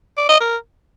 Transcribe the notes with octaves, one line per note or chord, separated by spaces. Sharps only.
D5
D#5
A#4